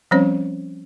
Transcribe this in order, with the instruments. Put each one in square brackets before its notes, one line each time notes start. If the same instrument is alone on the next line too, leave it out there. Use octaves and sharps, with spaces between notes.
[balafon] F3 G3 C4 C#4 C5 C#5